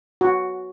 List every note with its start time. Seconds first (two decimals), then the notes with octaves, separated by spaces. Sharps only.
0.21 F#4